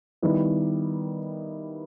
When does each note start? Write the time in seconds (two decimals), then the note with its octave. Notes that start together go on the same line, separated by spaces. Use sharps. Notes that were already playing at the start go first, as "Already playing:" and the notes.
0.22 D#3 G3 B3 E4